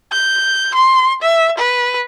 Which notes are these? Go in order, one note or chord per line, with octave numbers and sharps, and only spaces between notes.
G6
C6
E5
B4